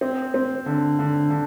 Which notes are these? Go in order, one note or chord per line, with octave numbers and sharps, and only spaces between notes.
C4
C4
D3
D3
D3